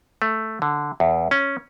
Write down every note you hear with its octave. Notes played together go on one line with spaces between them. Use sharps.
A3
D3
E2
C#4